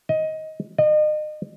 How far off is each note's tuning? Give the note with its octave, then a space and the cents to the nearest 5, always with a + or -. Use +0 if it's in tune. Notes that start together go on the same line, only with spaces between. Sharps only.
D#5 +15
D#5 -35